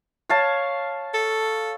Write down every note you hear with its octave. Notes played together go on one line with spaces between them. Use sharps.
C#5 F5 A5
A4